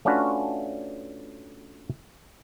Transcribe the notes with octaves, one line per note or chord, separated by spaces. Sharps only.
A3 C#4 D4 F4 F#4 B4